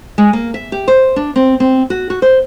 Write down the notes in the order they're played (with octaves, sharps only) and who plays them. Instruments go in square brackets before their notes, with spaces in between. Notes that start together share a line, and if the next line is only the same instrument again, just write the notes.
[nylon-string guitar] G#3
A#3
E5
G4
C5
D4
C4
C4
F#4
F#4
C5